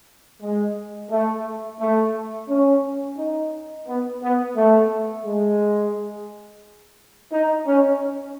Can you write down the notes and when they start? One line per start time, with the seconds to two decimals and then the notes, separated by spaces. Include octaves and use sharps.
0.42 G#3
1.11 A3
1.80 A3
2.49 C#4
3.18 D#4
3.87 B3
4.22 B3
4.55 A3
5.25 G#3
7.32 D#4
7.66 C#4